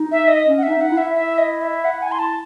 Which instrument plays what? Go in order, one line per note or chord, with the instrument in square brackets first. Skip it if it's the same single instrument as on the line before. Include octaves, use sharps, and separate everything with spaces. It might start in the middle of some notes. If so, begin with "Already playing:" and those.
Already playing: [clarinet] D#4
[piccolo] E5
D#5
[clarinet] C#4
[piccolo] F#5
E5
[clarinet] D#4
[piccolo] F#5
[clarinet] E4
[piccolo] E5
E5
D#5
E5
F#5
G#5
C6
A5